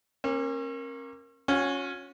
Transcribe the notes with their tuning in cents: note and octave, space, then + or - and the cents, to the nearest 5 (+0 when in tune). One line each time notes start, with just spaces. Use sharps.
A#3 +0 C#4 -40
C#4 +0 F#4 -40 G#5 -45